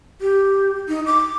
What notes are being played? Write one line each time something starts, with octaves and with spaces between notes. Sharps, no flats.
G4
D#4
D6